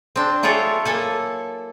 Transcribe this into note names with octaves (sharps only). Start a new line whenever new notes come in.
C4 D4
F#3 E4 F4 G#4 A4 C#5
A#3 A4 G#5